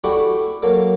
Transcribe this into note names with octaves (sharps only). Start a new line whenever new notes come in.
A3 D4 E4 F#4 G4
F#3 A#3 A4